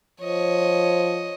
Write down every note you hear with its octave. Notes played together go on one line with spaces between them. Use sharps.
F3 C#5 D#5